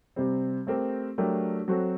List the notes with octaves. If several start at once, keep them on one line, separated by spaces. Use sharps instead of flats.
C3 G3 C4
A3 C4 G4 A#4
F#3 A3 D4 G4 A#4
F#3 C4 F#4 A4